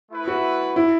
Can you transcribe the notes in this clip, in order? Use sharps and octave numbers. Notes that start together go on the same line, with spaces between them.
A3 E4 B4
F#4
E4